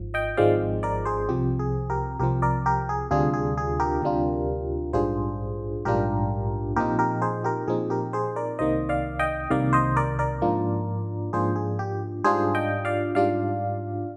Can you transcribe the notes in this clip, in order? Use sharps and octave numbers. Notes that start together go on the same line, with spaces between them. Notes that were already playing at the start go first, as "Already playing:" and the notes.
Already playing: G#1 G#2 F3
D#5 G5
G#1 G#2 F3 G#3 C4 D5 F5
A#4 D5
G#4 C5
C2 C3 F3 C4 G4
G#4
G4 A#4
C2 C3 F3 C4 G4 A#4
A#4 D5
G4 A#4
G#4
D2 C3 G3 D4 F4 G#4
G#4
G#4
G4 A#4
D2 C3 G3 D4 F4
A#1 G#2 G3 D4 F4 G#4 C5
A#1 G#2 G3 D4 F4 G4 A#4
A#2 F3 C4 D#4 G4 A#4
G4 A#4
G#4 C5
G4 A#4
A#2 F3 C4 D#4 G#4
G4 A#4
G#4 C5
A#4 D5
C2 C3 D#3 A#3 C5 D#5
D5 F5
D#5 G5
C2 C3 D#3 A#3 D5 F5
C5 D#5
A#4 D5
A#4 D5
G#2 F3 A#3 D4 F4
G#2 F3 A#3 D4 F4 G#4 C5
G#4
G4
G#2 G3 D4 F4 G#4 C5
D#5 G5
D5 F5
G#2 G3 D4 F4 D5 F5